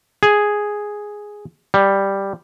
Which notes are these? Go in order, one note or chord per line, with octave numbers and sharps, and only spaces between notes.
G#4
G3